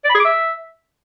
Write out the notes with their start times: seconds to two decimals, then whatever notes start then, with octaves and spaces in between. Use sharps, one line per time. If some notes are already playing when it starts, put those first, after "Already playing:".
0.04 D5
0.10 B5
0.15 G#4
0.20 D6
0.25 E5